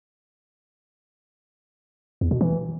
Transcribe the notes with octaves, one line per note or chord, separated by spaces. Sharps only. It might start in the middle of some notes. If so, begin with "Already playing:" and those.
E2
B2
E3